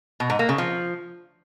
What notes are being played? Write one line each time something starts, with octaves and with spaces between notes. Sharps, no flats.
B2
G#2
A#3
C#3
F3